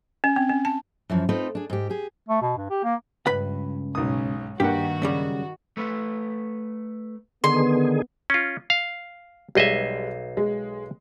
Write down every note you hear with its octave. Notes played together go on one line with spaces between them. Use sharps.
C#4
C4
C#4
A5
F#2 E3 F3
C4 D#4 F4 A4 B4
D4 G#4
G#2 G4
G4 G#4
A3
B2
G2
G4
A#3
C#2 G2 B4 B5
B1 G#2 C#4 D#6
G2 D#3 A#3 F#4 G4 F#5
F#2 C#3 G3
A3 B4
D3 D#3 B3 G#4 C6
C#4 F4
F5
B1 G3 G#3 D#5 E5 C7
G#3